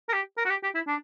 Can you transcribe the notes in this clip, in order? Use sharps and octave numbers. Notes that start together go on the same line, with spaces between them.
A#4
G4
A#4
F#4
G4
G4
E4
D4